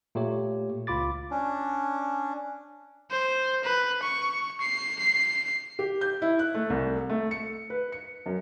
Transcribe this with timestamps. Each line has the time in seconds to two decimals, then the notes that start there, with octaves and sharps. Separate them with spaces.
0.15 A#2 A3 G4 C#5
0.87 C#2 F4 B5 D6 A6
1.31 C#4 D4
3.11 C5
3.64 B4
4.03 C#6
4.61 C7
5.00 C7
5.79 G4
6.01 G6
6.22 E4
6.39 F#6
6.54 A3
6.70 C2
7.09 A3
7.31 C#7
7.70 B4
7.92 C#7
8.26 F#2